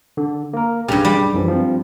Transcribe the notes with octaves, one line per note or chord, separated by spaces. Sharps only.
D3
A#3 A#4
B1 G2 C#3 G4
G3
F#2 E3 F3
F3 C4